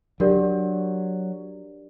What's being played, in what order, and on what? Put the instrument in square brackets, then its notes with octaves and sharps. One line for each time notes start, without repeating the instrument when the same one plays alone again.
[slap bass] F#3 [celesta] D4 G4 A#4 D5